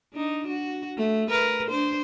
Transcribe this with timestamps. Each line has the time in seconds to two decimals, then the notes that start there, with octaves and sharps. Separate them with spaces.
0.13 D4 D#4
0.48 F#4
0.97 A3
1.30 A#4 B4
1.69 D4 C5